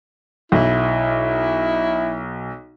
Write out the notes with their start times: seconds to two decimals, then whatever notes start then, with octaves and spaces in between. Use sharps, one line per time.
0.52 B1 E4